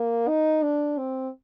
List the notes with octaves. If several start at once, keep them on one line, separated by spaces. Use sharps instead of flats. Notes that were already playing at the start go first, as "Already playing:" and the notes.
Already playing: A#3
D#4
D4
C4